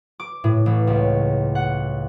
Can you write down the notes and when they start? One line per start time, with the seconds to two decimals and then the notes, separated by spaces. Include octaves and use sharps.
0.20 D6
0.44 A2
0.66 A1
0.87 C#2
1.55 F#5